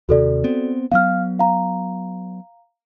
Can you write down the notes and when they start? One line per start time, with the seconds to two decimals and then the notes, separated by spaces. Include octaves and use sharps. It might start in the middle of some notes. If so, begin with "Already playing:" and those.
0.09 D#2 C3 F#4 A4 D5
0.44 B3 C4
0.92 F#3 B3 F5 F6
1.39 F5 A#5